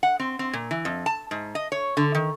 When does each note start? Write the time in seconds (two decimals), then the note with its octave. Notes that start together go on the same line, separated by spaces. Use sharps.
0.03 F#5
0.20 C4
0.39 C4
0.53 A#2
0.71 E3
0.85 F2
1.06 A5
1.31 G#2
1.55 D#5
1.72 C#5
1.97 D3
2.15 D#3